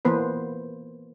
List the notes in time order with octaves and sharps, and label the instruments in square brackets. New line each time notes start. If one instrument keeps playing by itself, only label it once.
[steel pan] E3 A#3 B3 B4 C5